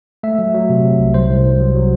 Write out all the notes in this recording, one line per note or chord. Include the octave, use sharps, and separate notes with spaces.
A3 E5
F#3
F#3
C3
C3
C2
C2 C5
C2
C2
F#3
F#3